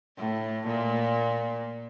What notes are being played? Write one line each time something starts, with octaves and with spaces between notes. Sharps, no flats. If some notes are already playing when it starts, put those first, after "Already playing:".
A2
A#2